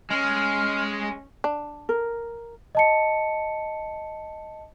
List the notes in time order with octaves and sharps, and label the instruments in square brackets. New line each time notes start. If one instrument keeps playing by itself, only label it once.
[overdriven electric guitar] G#3 [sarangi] C#4 [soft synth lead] F6
[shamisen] D4
[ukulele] A#4
[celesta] D#5 A5 C#7